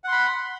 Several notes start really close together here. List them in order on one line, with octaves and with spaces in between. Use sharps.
F#5 C6 B5